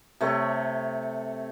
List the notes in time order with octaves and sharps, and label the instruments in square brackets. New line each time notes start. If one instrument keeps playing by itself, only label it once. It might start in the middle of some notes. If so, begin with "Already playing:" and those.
[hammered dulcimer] C3 A3 C#5 C#6